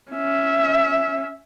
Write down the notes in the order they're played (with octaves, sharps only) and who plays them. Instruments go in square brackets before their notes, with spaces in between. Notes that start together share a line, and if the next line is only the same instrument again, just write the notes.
[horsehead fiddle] C#4 E5